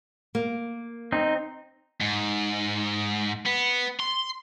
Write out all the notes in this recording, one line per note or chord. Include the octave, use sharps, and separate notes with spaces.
A#3
C4 D#4
G#2
B3
C6